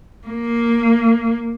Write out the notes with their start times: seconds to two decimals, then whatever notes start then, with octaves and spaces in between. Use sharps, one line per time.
0.28 A#3